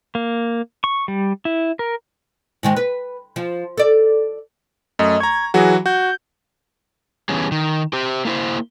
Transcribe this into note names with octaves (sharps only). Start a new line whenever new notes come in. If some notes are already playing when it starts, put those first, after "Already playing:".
A#3
C#6
G3
E4
A#4
G#2 D#3 G#3
B4
F3
A4 D5
F#2 A3 D#5
A#5 C#6 G#6
E3 F#3 F#4 G#4
F#4 G6
E3 G3 B3 C#4 G#4
D#3
G4 C5
A#3 E4 C5